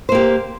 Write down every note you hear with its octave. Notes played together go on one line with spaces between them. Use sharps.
A#3 G4 C5